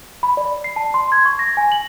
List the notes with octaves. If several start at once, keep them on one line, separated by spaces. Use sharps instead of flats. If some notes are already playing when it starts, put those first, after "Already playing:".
B5
D5
C7
A5
C6
G#6
C#6
A#6
G#5
F#7